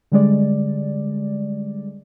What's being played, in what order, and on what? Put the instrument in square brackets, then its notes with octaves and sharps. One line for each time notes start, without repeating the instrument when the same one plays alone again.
[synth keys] D3 G3 G#3 D5